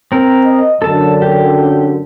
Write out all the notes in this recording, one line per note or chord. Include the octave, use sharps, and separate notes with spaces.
C4 A#4
D#5
F#2 D3 A4 A5
G4